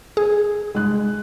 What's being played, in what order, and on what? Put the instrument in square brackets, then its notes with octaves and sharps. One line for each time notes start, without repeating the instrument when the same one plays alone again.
[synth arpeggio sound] G#4
[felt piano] G#3 F#6